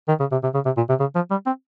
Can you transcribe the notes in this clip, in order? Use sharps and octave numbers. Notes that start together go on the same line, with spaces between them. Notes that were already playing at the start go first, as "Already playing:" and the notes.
D#3
C#3
C3
C3
C#3
C3
A#2
C3
C#3
F3
G3
C4